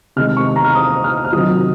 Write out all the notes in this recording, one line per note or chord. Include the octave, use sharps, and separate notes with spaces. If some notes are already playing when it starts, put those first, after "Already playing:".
C3 D#3 G#3 F6
C#6
A#5
F6
D#6
F6
F6
C3 D#3 F#3 D#6